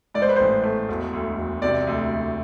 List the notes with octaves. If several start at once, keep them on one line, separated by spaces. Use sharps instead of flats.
G#2 D5
C5
B4
A1 C5
A3
E1
D2
E1
C3 D5
D2
D2